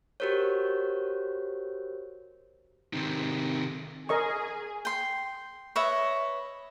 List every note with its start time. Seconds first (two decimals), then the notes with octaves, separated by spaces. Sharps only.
0.20 F#4 G4 A#4 C5 C#5
2.93 C3 D#3
4.09 G#4 A#4 D#5 C#6
4.85 G5 C6
5.76 B4 C#5 D#5 E5